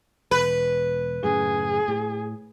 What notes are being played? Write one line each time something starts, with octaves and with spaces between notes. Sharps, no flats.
E1 B4
F#2 A2 C#3 G#4
A2